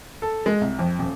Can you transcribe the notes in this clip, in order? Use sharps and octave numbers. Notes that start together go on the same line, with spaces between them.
A4
G#3
C2
F2
D#1